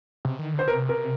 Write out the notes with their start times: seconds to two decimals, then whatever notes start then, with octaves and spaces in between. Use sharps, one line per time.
0.25 C3
0.39 D#3
0.54 D3 C5
0.68 C3 A#4
0.89 A#4